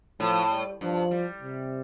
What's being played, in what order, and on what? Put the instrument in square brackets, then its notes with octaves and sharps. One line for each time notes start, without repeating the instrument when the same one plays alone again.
[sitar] A2 [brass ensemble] F3
[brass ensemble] G3
[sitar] G2 [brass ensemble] F3
[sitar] G3
[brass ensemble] C3